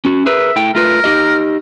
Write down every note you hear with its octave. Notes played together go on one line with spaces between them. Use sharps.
C#4 F#4
G#4 A#4 B4 E5
A3 E4 G5
A3 F4 A#4 B4
D#4 G4 D#5